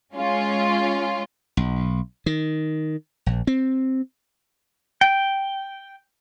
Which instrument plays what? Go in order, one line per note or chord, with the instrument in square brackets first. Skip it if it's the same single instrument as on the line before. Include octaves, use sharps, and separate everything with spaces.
[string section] G#3 C#4 F4
[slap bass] B1
D#3
A#1
C4
[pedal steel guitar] G5